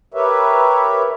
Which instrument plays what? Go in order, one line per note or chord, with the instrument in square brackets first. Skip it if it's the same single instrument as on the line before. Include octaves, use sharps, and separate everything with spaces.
[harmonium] G4 A#4 B4 C#5 E5